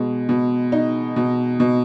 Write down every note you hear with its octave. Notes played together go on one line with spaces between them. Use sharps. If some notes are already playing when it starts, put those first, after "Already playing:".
Already playing: B2 G#3
B2
D#4
B2
B2